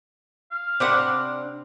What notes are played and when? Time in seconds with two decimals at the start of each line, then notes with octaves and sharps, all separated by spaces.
0.52 F5
0.80 C3 C4 D4 B4 F#5 G5